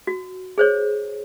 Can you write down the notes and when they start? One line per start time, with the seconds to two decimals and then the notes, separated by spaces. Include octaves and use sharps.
0.07 F#4
0.58 G#4 C5 C#5